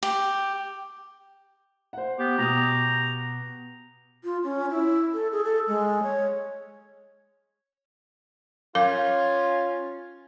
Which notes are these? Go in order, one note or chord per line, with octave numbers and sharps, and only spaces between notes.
G4
C5 F#5
B3 G4
B2 A#5 D#6
F4
C#4
E4
A4
G#4
A4
G#3
C#5
C#4 F4 A#4 F5 D6